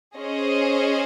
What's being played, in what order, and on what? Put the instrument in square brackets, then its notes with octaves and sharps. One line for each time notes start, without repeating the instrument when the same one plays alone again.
[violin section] C#4 G#4 C5 D#5